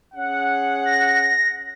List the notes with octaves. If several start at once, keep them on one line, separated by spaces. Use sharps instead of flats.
C#4 G#4 F#5
A#6